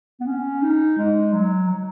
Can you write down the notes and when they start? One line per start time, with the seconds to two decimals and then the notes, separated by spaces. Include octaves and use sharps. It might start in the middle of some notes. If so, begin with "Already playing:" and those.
0.21 B3
0.27 C#4
0.62 D#4
0.98 G#3
1.33 F#3
1.69 F#3